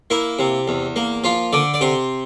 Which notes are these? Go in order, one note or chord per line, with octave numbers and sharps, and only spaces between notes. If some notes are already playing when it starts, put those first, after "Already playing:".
A#3 E4
C3
E2
A#3
F3 F4
D3 D5
D5
C3 C5